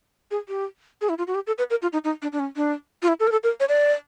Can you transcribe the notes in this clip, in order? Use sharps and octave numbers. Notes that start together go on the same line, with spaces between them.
G#4
G4
G#4
E4
F4
F#4
G4
A4
B4
A#4
F4
D#4
D#4
D4
D4
C#4
D4
F4
E4
A4
A#4
A4
A#4
C#5
D5